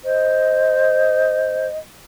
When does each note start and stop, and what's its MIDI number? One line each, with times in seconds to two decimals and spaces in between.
0.05 1.68 72
0.05 1.78 75